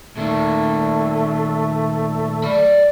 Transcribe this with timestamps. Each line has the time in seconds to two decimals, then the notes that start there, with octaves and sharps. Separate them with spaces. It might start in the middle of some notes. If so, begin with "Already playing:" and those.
0.17 A#2 D#3 A3
2.44 D5 B5